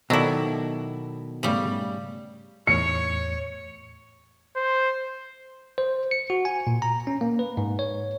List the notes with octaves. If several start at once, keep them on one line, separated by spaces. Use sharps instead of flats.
B2 D#3 F#3 E4 A4 D5
G#2 C#3 G3 A3 B3
E2 A2 C#5 C#7
C5
C5
C#7
F#4
G#5
A#2
A#5
C#4
A#3
B4
G#2
C#5